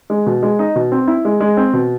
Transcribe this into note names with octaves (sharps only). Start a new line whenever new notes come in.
G#3
B2
G#3
D#4
B2
C4
E4
G#3
G#3
C4
B2